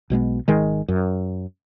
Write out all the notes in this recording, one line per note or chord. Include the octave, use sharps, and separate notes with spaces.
B1 B2 G#3 B3
G#1 D#3 G#3
F#2